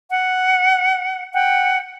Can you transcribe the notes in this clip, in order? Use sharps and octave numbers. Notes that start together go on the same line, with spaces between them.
F#5
F#5 G5